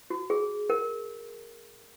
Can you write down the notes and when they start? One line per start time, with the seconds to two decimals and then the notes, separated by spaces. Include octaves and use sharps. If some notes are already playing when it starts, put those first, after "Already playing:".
0.10 F#4
0.30 G#4
0.70 A#4